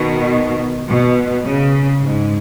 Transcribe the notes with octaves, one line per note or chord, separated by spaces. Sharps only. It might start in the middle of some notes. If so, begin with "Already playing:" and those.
Already playing: B2 D#3
B2
C#3
G#2